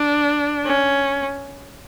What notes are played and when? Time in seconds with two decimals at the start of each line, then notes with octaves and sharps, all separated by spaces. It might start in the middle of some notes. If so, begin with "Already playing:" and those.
Already playing: D4
0.66 C#4